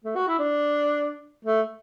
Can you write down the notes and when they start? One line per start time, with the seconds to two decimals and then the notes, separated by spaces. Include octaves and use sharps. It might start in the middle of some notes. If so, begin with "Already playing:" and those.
0.05 A3
0.15 F#4
0.28 E4
0.39 D4
1.45 A3